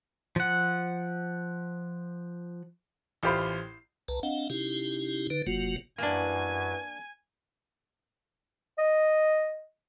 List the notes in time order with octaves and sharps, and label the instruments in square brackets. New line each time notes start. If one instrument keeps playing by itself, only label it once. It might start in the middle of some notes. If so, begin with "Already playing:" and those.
[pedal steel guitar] F3 F#5
[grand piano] A1 F4 G4 C5 B5 C7
[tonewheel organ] C2 B4 A5 A#5
C4 D4 D#5 F5 F#5
C3 C#4 D#4 E4 G4
D3 D#4 B4
F#1 C3 F#3 A#3 F4 F#4
[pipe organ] F#2 [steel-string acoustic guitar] E3 G3 [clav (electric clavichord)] A#3 D4 [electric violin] G#5
[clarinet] D#5